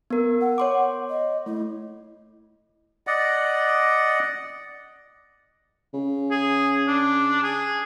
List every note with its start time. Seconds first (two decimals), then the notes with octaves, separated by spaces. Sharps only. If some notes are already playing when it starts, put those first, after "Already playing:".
0.10 B3 A#4
0.41 F#5
0.58 C#5 C6 D6
1.09 D#5
1.46 A3 E4
3.07 D5 D#5 F#5
5.94 C#3
6.31 G#4
6.88 D4
7.43 G#4